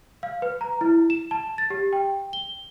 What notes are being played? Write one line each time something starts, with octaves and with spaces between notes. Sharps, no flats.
F5
B4
A#5
E4
E7
A5
A6
G4
G5
G7